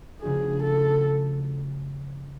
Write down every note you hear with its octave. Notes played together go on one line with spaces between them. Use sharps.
C#3 F3 A3 D4 F#4 G#4
A4